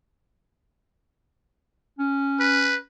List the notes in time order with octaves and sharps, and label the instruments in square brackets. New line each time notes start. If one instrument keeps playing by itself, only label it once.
[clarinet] C#4
[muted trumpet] B4